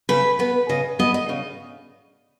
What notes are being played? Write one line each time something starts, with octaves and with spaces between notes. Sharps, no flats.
C#3 B4
B3 B4
C#3 D#5
B3 D#5
D#5
C#3